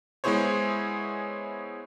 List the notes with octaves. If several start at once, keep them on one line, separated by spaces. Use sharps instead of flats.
G#3 B3 E4 G#4 C5 C#5